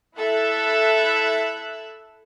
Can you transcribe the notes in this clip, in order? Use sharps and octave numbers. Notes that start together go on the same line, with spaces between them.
E4 A4 E5 E6 F#6